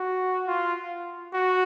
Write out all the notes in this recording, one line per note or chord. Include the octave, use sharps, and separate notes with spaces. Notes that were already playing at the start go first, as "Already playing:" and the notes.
Already playing: F#4
F4
F#4